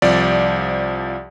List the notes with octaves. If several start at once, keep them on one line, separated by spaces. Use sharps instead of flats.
C2 F3 D5